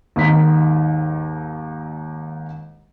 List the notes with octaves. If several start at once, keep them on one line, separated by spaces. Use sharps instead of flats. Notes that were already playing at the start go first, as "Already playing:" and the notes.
D#2 G#2 D#4 B6